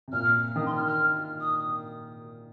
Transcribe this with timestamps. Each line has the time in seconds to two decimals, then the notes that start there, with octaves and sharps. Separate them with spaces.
0.08 C3
0.13 A#2 F6
0.56 D#3 D#6
0.66 C6
0.76 F6
0.87 F6
1.41 D#6